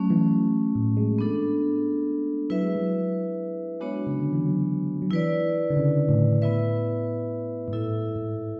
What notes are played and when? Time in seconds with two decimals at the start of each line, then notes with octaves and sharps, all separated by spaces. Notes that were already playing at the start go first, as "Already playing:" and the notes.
Already playing: F#3 A3 C#4 F#4
0.10 E3
0.75 A2
0.97 G#3
1.18 B3 D4 A4
2.50 F#3 E4 B4 E5
2.63 G#3
2.76 F#3
3.80 G#3 B3 D4 F#4 C#5
4.07 C#3
4.20 D3
4.33 E3
4.46 F#3
5.02 F#3
5.11 E3 E4 B4 D5
5.70 D3
5.77 C#3
6.09 A2
6.42 B3 E4 B4 E5
7.68 G#2
7.72 A2 E4 A4 E5
8.16 G#2